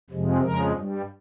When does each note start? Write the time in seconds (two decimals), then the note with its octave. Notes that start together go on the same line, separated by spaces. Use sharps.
0.10 F2 C3 F3 G#3
0.41 F2 C#3 F3 G#3 A#4
0.71 G2
0.77 G3